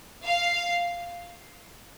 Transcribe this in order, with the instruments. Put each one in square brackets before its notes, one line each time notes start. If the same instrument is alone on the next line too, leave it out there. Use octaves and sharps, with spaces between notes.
[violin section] F5